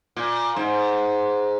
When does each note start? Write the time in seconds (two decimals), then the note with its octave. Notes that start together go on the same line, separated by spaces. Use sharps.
0.16 A#2
0.56 G#2